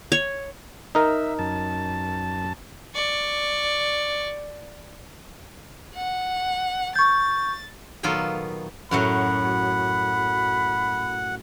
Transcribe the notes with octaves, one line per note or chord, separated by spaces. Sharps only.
C#5
D#4 A#4 E5
F#2 A5
D5 C#6
F#5
C#6 G6 A6
A#2 D#3 F#3 B3 F4 A4
F#2 A2 F#3 F#5 B5